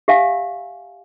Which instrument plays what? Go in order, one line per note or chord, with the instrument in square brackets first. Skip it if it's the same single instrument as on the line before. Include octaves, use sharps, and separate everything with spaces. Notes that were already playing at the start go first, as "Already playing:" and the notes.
[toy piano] G4 E5 F5 G#5